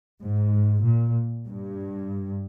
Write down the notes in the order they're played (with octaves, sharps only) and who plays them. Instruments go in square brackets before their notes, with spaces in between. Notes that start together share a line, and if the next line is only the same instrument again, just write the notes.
[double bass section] G#2
A#2
G2